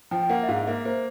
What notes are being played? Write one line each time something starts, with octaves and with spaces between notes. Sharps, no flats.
F3 G5
G5
A#3 F#5
E5
G#2 F5
A#3 E5
A#3 C5